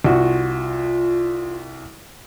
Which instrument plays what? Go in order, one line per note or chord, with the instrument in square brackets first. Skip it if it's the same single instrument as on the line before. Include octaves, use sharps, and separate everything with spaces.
[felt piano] C2 F#4 [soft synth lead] F4